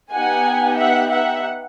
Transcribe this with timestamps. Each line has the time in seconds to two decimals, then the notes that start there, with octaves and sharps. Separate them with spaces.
0.13 B3 D#4 G4 F#5 G#5
0.77 E5 F#5
1.10 E5 F#5